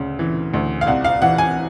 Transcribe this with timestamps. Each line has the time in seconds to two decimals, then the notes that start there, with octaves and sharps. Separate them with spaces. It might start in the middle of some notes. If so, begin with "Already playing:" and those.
Already playing: D2 C#3
0.19 E3
0.54 D2
0.81 F5
0.87 C2 F#5
1.04 F5
1.22 E3 F#5
1.38 G#5